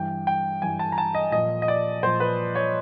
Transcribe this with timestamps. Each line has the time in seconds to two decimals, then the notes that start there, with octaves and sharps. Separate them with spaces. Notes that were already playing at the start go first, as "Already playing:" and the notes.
Already playing: G2 E3 G5
0.27 G5
0.62 G2 E3 G#5
0.79 A5
0.92 A#5
0.98 A5
1.15 D#5
1.32 A#2 F3 D#5
1.62 D#5
1.68 D5
2.02 A#2 F3 C5
2.20 B4
2.55 C#5